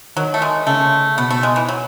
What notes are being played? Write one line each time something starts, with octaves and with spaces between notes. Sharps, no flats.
D#3 F#3
A3
G#3
C#3 A3
B2 B3
A3
G#3
E3
F#3